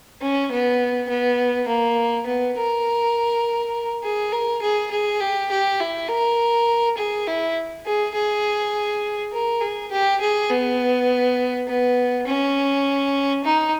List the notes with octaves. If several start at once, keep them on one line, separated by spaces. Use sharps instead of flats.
C#4
B3
B3
A#3
B3
A#4
G#4
A#4
G#4
G#4
G4
G4
E4
A#4
G#4
E4
G#4
G#4
A#4
G#4
G4
G#4
B3
B3
C#4
D#4